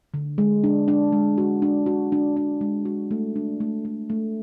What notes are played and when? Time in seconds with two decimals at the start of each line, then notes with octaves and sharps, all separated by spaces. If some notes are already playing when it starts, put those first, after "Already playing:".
0.14 D3
0.38 G#3
0.64 D4
0.88 D4
1.12 G#3
1.38 F#4
1.62 D4
1.86 F#4
2.12 D4
2.37 D4
2.61 G#3
2.85 F#4
3.11 A3
3.36 D4
3.60 A3
3.85 A3
4.10 A3